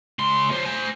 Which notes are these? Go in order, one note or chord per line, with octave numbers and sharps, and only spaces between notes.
C#2 C6
F#3 C5
C5 G#5